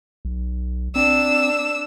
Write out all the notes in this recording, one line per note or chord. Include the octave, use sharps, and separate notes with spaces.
B1
C4 D4 E6